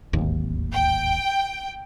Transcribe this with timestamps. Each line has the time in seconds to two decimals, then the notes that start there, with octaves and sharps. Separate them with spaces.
0.13 D1 G#1 D#2
0.72 G5